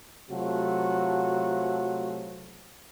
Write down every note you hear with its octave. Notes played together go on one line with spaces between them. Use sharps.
C3 F#3 A3 F4 F#4